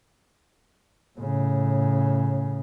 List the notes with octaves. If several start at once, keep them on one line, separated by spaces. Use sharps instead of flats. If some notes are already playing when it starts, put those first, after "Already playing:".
A2 C#3